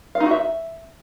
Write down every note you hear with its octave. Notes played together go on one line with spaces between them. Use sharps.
F5
D#4
F#4
E5